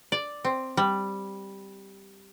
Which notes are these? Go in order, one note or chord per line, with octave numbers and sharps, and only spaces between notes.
D5
C4
G3